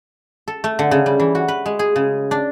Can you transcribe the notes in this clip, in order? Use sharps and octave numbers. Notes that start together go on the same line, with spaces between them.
A4
A3
D3
C#3
G3
E3
F#4
B4
G#3
G#4
C#3
D4